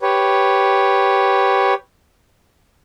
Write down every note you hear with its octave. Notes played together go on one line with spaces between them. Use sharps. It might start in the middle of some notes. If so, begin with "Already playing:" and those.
G4 B4 C#5